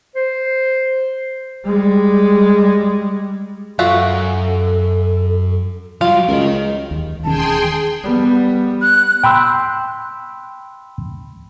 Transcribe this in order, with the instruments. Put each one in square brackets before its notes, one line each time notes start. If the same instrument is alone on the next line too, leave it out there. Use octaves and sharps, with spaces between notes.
[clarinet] C5
[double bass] G3 G#3
[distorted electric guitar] F#2 [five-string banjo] F4 F#4 E5 [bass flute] A4
[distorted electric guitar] F#3 G3 [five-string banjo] F4 [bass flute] F#4
[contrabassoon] C#2 [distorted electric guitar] A#4 D#5
[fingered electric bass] D#2
[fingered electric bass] E1 D#3 C#4 [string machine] G#4 G5 C6 [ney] A5
[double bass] G3 B3
[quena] F#6
[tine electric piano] G5 B5 C6 E6